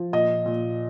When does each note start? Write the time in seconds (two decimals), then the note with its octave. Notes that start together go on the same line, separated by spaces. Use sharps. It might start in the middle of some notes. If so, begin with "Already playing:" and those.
Already playing: F3
0.13 A#2 D#5
0.46 A#2